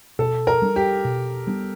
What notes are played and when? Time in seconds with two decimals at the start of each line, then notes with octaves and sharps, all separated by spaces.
0.19 B2 A4
0.47 A#4
0.62 G3 B3 D4
0.76 G4
1.05 B2
1.47 G3 B3 D4